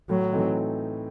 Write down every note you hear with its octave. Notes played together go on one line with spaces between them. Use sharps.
A2 F#3
E3 A3 C4 D#4